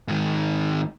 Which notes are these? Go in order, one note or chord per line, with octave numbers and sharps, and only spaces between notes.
G#2 D#3